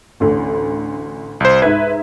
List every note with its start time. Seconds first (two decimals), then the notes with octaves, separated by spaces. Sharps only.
0.20 A1 D2
1.40 C2 C5
1.62 G#2 B4 E5 G#6